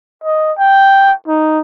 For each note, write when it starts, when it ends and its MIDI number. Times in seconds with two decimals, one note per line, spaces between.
0.24 0.52 75
0.58 1.12 79
1.27 1.61 63